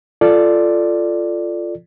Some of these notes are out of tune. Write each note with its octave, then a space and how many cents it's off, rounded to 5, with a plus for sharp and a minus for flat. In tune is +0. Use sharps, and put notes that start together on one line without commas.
F4 -10 A4 +0 D5 +5